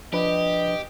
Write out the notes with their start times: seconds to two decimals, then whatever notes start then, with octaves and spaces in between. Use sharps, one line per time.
0.13 F3 D4 G4 B4 D#5